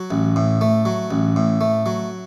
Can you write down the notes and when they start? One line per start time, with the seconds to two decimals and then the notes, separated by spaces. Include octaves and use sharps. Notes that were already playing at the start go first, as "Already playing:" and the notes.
Already playing: F#3
0.11 A1
0.36 A2
0.61 A3
0.85 F#3
1.11 A1
1.36 A2
1.61 A3
1.86 F#3